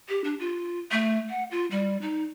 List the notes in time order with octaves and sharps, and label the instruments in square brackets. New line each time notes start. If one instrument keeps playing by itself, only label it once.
[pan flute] G4
D4
F4
A3
F#5
F4
G3
D#4